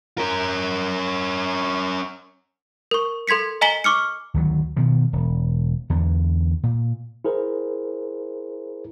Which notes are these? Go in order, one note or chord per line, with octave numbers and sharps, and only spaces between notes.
C#4 A#4
A#4 C#6
A4 C6 G#6 B6 C#7
D#5 G#5 A#5 B6 F#7 G7
C#6 D6 F6 C#7
D2 D#3 F#3
B2 D#3 F3
E1
E2 D3
A#2
E4 G#4 A#4 C5